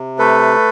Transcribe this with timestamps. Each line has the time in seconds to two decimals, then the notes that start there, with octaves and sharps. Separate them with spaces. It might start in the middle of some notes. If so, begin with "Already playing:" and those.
Already playing: C3
0.19 A3 A4 B4